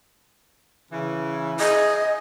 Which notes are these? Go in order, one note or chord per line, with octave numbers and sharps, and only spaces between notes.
C#3 E3
G#4 D#5